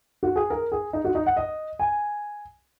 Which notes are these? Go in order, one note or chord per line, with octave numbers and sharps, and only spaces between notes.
F#4
G#4
A#4
G#4
D#4
F#4
D#4
F#5
D#5
G#5